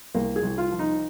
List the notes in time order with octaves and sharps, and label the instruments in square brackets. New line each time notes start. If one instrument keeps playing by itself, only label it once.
[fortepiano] C2 A#3
G#4
C2
F4
F3
D#4